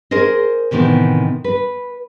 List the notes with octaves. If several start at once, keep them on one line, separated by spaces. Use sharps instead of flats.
G#4 A#4 C5 D#5
A2 C3 D#3 E3 B3
B4